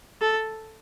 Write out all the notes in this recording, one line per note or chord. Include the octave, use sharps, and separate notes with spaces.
A4